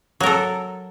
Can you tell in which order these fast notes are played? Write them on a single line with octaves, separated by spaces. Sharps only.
F#3 A#4 A4